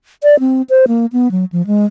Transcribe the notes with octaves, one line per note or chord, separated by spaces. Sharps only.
D5
C4
C5
A#3
B3
F#3
F3
G#3